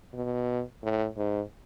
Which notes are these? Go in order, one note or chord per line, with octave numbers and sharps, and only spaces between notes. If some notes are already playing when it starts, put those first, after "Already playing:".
B2
A2
G#2